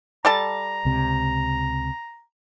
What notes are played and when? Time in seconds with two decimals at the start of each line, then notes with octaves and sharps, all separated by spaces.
0.25 G3 A4 A5 A#5
0.85 C#2 C3